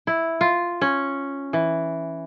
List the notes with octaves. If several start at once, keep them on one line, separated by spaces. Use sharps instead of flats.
E4
F4
C#4
E3